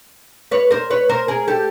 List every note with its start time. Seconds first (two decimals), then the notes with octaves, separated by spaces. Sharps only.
0.51 B4 C#5
0.71 A#4 C5
0.90 B4 C#5
1.09 A#4 C5
1.28 G#4 A#4
1.48 G4 A4